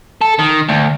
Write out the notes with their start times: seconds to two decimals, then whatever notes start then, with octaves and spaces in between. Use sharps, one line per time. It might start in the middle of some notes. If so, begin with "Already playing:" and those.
0.21 A4
0.39 D#3
0.68 D2